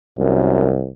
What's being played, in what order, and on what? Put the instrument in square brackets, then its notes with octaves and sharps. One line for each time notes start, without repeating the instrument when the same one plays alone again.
[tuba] C2 [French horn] F#2